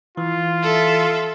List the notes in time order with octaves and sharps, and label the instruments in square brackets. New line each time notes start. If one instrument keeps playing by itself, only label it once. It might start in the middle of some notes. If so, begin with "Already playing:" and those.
[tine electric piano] E3 [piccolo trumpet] F4
[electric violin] A4 E5